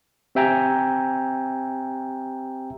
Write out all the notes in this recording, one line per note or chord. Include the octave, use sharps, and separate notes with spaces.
C4 G4 E5 G5 G#5 A#5